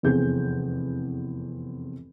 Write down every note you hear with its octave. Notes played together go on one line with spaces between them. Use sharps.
F1 E2 C4 G#4 G6